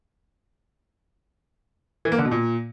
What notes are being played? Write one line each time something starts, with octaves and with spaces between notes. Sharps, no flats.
E3
A#3
D3
B2
A#2